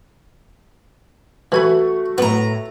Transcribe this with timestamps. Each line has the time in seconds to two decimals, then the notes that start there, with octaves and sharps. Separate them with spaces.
1.52 E3 A3 F#4 G#5 B5
2.18 A2 B3 A#5